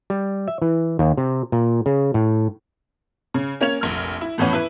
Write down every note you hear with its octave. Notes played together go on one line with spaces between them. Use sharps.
G3
E5
E3
D#2
C3
A#2
C#3
A2
C#3
A#3 C#4 G#6 F7
F1 A#1 F6
E4
F2 A2 E3 B3 C#4
E4 B4